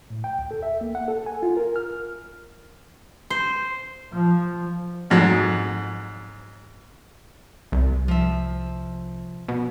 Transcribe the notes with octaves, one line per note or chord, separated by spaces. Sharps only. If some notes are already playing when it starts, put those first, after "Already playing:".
A2
G5
D2
A4
E5
A#3
F#5
A4
G#5
F4
A#4
F6
C5
F3
F2 G#2 F#3
C2
F3 E5
B2